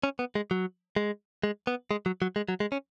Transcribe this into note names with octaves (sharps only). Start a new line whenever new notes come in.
C#4
B3
G#3
F#3
G#3
G#3
B3
G#3
F#3
F#3
G#3
F#3
G#3
C#4